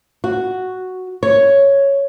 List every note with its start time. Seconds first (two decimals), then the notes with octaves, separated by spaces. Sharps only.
0.24 F#4
1.23 C#5